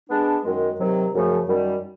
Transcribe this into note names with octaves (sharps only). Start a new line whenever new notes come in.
G#3 B3 D4
F#2 D#3 G#3
C3 D#3 F#3
F#2 C#3 F3 A3
F#2 D#3 G3